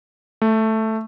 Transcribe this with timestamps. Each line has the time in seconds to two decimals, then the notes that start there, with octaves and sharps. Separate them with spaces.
0.42 A3